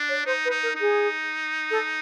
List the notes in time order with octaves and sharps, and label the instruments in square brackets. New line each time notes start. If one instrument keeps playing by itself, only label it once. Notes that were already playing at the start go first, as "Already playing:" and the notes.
Already playing: [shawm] D4
[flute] C#5
[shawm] D#4 [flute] C5
[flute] B4
[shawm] D#4
[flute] A#4
[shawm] D#4
[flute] G#4
A4